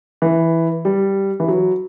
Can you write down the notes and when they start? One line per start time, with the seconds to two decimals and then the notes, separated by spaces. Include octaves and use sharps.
0.22 E3
0.85 G3
1.40 E3
1.48 F#3